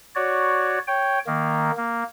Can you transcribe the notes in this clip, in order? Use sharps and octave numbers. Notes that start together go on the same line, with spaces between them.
F#4 C#5 D5
C#5 G5
D#3 A#3
A#3